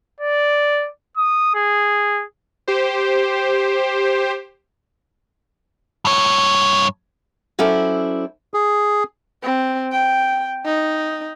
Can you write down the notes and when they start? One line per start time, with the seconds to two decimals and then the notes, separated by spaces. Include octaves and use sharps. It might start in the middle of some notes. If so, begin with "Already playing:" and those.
0.20 D5
1.17 D#6
1.54 G#4
2.68 G4 C5
6.05 G2 C#5
7.59 F#3 C#4 E4 A4 C5 D5
8.54 G#4
9.43 C4
9.92 G5
10.65 D#4